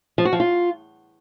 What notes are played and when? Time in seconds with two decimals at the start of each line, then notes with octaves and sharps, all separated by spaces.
0.18 F3
0.25 F#4
0.33 F3
0.40 F4